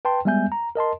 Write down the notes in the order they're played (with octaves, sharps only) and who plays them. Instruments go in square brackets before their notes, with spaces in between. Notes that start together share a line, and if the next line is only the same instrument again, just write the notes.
[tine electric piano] B4 G5 A5 C6
G3 G#3 B3 E5 G#5 G6
A#5
A#4 D#5 A5 C6